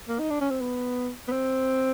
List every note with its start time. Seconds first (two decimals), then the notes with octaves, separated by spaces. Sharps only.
0.09 A#3
0.20 D#4
0.30 D4
0.41 C#4
0.51 C4
0.61 B3
1.28 B3
1.32 C4